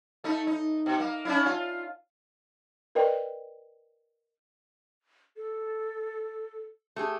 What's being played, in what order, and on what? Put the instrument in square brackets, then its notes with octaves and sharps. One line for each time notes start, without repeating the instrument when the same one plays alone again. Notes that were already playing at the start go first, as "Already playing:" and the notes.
[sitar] A3 D#4
D#4
B2
A#3
C#4 D4 E4
F4
[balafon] A#4 B4 D5 D#5 G5
[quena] A4
[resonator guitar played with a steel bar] A3 G4 G#4